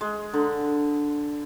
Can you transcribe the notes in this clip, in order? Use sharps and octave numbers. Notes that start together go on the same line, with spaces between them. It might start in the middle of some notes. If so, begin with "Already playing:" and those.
G#3
D3